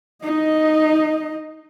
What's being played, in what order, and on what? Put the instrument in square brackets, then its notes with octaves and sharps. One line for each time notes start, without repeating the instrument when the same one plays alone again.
[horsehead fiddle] D#4 D#5